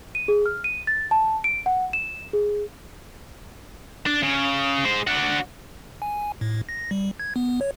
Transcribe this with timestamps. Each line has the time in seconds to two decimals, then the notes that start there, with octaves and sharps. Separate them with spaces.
0.15 D#7
0.28 G#4
0.46 F6
0.64 D#7
0.87 A6
1.11 A5
1.44 D7
1.66 F#5
1.93 E7
2.33 G#4
4.06 D4
4.22 C#3
4.84 G#3 C5
5.07 D4 F#4
6.02 G#5
6.41 A2
6.69 A#6
6.91 G3
7.20 G#6
7.36 B3
7.61 C#5